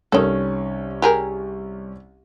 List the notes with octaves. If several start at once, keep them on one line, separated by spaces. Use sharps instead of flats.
C2 D#3 C#4 A4
G4 G#4 A#4